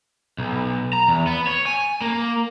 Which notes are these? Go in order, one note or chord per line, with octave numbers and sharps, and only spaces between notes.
B1
A#5
E2
B3
C#5
G#5
A#3